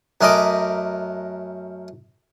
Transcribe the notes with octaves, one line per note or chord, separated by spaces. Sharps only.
F#2 A3 A#4 D#5 B5 D6